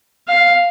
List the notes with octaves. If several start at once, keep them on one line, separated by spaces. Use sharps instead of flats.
F5